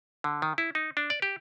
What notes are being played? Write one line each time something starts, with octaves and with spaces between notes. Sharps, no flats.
D3
D#3
E4
D#4
D4
D5
G4